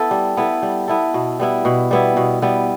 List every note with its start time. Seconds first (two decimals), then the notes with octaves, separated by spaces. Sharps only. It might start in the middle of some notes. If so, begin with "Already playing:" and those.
Already playing: B3 E4 A4
0.11 G3
0.37 B3 E4 A4
0.62 G3
0.88 B3 E4 A4
1.14 B2
1.40 G3 B3 E4
1.65 B2
1.91 G3 B3 E4
2.17 B2
2.42 G3 B3 E4